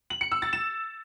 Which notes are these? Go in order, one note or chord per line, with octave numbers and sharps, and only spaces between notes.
F#7
C#7
E6
A6
E7